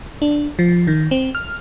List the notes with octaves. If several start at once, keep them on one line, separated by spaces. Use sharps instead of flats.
D4
F3
D#3
C4
F6